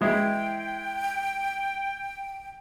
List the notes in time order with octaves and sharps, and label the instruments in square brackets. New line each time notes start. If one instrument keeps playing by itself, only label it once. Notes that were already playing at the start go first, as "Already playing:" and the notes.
[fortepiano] E3 G#3 E4 [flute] G5